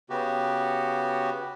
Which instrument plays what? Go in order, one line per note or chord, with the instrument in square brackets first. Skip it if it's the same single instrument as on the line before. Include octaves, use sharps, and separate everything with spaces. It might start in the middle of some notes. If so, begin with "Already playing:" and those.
[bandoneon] C#3 B3 F#4 G4